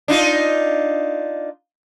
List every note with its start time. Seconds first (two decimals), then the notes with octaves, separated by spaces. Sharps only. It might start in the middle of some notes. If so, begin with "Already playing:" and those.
0.08 D4 D#4 F4